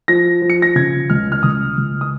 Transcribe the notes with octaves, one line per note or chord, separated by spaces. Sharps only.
F3 A#6
F3
C#7
A#6
C#3 G#6
C#2 F6
F6
C#2 D#6
C#2
D#6